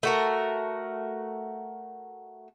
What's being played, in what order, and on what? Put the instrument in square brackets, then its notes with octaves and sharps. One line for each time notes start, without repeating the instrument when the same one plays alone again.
[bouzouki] A3 F#4 A#4